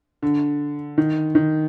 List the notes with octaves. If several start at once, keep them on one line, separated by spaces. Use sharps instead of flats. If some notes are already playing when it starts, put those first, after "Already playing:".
D3
D#3
D#3